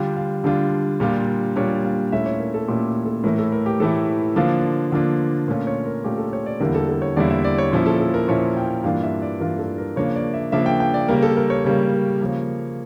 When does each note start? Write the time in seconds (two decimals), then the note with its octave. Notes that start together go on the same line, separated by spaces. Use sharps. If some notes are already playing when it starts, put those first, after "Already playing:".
Already playing: D3 G3 D4 F4 G5
0.17 F5
0.44 D3 G3 D4 F4
1.00 A#2 G3 D4 F4
1.56 A#2 G3 D4 F4 C#5
1.84 F5
2.12 A#2 A3 C#4 E4 E5
2.26 C#5
2.40 A#4
2.54 A4
2.68 A#2 A3 C#4 E4 G4
3.05 A4
3.24 A2 E3 A3 E4 A#4
3.38 A4
3.52 A#4
3.66 G4
3.80 A2 E3 A3 E4 A4
4.36 D3 F3 A#3 D4 F4
4.92 D3 F3 A#3 D4 F4
5.48 A#2 A3 C#4 F4 A#4
5.67 C#5
5.86 A#4
6.04 A#2 A3 C#4 F4 G4
6.18 A4
6.33 C#5
6.46 D5
6.60 E2 D3 G3 A#3 E4 A#4
6.75 A4
6.89 A4
7.02 C#5
7.17 E2 D3 G3 A#3 E4 D5
7.30 E5
7.44 D5
7.58 C#5
7.72 A#2 F3 C#4 E4
7.86 A4
8.01 A4
8.14 A#4
8.28 A#2 F3 C#4 E4 C#5
8.57 G5
8.84 G2 E3 A#3 D4 F4 F5
9.03 E5
9.22 D5
9.40 G2 E3 A#3 D4 F4 A#4
9.59 A4
9.78 A#4
9.96 C#3 F3 A#3 D4 C#5
10.15 D5
10.34 E5
10.52 C#3 F3 A#3 D4 E5
10.66 G5
10.80 G5
10.94 D5
11.08 C#3 G3 A#3 A#4
11.23 A4
11.37 A#4
11.50 C#5
11.64 C#3 G3 A#3
12.21 C#3 F3 A#3